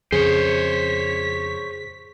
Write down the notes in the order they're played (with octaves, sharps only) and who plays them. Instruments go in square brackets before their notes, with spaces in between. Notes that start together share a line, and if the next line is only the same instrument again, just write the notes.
[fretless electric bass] F2 C#3 [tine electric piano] G#4 [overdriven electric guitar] C5 C#5 [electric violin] B6